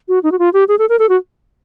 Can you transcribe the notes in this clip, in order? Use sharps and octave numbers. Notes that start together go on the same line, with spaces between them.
F#4
D#4
F#4
F4
G4
G#4
A4
A#4
A4
F#4